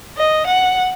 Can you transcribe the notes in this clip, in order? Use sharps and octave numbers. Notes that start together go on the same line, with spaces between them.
D#5
F#5